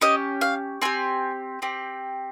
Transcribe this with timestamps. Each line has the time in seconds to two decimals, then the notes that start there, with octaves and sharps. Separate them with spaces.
0.01 C#4 G4 D#5
0.41 F5
0.82 C4 G4 G#5
1.62 C4 G4